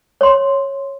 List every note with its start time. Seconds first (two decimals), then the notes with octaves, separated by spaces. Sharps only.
0.21 C#5 C6